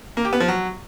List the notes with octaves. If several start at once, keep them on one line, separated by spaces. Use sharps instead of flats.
A#3
G4
B3
F3
F#3